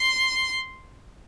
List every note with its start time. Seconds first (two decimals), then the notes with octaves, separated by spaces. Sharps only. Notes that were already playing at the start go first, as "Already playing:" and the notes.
Already playing: C6